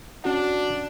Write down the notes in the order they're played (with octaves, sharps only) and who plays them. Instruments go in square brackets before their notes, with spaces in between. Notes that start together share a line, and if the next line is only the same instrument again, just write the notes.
[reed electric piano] C#4 F#4 F#5 [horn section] D4